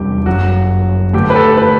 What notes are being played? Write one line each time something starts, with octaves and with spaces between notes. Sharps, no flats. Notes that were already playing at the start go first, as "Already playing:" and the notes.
Already playing: E2 C3 G3 D4 G4
G1 F#2 F#3 F#4
G2 D3 A3 G4
B4
A4
B4